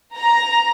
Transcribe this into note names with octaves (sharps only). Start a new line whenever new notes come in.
A#5